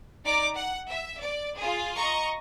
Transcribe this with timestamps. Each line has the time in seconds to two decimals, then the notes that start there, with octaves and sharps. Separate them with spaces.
0.24 D#4 D5 A#5 D6
0.55 F#5
0.90 E5
1.22 D5
1.57 F4 G#4
1.97 D#5 A#5 C#6